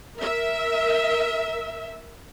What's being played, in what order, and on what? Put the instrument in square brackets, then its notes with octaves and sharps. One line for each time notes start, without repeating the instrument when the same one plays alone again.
[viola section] A#4 E5